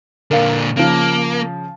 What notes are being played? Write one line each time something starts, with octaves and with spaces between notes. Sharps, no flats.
A#2 D3 A#4 F5
C#3 F3 A#3